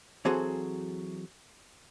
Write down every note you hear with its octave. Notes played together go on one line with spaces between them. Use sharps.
E3 F#3 C4 F#4 G#4 A4